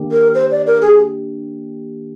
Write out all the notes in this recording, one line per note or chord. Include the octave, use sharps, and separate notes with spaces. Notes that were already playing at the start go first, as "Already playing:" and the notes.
Already playing: D#3 A#3 D4 G4
A#4
C5
D5
A#4
G#4